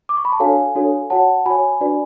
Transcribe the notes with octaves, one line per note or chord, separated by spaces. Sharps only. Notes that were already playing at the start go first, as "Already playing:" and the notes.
D6
C#6
B5
A5
D4 F#4 A4 C#5 F5 G#5
D4 F#4 A4 C#5
F#4 C#5 F#5 A5
F#4 C#5 G#5 B5
D4 F#4 B4 D5